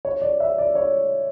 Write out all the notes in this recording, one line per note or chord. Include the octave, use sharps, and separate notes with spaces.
C#5
D5
E5
D5
C#5